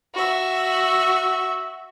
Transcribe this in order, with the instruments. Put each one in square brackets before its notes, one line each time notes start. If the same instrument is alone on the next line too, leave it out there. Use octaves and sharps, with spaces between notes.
[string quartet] F#4 E5